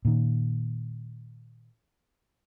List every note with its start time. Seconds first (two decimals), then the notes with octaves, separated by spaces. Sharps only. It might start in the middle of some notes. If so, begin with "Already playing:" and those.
0.05 A#2 D#3